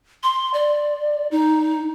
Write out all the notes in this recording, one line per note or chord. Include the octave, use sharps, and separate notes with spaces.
C6
D5
D#4